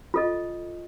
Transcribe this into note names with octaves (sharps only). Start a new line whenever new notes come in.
F4 A4 D#5